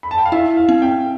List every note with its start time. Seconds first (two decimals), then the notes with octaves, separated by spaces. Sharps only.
0.03 B5
0.11 A5
0.18 G5
0.26 F5
0.32 E4 E5
0.57 F5
0.69 C4
0.82 G5